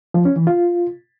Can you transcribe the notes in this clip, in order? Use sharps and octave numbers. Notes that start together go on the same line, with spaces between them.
F3
C#4
E3
F4